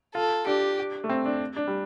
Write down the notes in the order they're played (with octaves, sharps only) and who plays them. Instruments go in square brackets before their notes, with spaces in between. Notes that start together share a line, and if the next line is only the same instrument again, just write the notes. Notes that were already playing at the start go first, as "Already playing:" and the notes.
[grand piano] F4 [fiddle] A4
[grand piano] D4 [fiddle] G4
[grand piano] A3
C4
D4
D4
G3